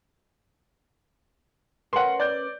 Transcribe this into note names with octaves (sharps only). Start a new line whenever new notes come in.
C#4 A#4 B4 F#5 C6
D5 G6